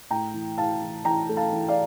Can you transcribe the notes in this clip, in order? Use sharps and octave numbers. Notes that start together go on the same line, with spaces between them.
A2 G5 A#5
E3
E4 F5 A5
E3
E3 G5 A#5
A3
F5 A5
E3
D5 F5